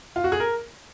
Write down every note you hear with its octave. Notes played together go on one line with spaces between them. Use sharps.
F4
F#4
G#4
A#4